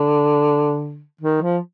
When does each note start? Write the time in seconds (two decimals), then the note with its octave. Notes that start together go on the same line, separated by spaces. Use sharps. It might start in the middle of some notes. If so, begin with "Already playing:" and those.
Already playing: D3
1.21 D#3
1.42 F3